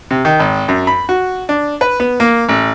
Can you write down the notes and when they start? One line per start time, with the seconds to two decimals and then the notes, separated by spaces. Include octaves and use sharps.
0.11 C3
0.25 D#3
0.40 G#1
0.68 F#2
0.87 B5
1.09 F#4
1.49 D4
1.81 B4
2.00 B3
2.20 A#3
2.49 A1